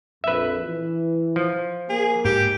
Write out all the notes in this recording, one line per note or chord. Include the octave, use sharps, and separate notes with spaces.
A#1 F2 B4 E5
E3
F3
A#3 G#4
G#2 G4